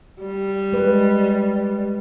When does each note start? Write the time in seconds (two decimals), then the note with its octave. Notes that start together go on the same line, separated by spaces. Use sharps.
0.22 G3
0.73 G#3 B4